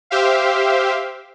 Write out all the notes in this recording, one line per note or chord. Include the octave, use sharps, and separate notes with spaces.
G4 C5 E5 F5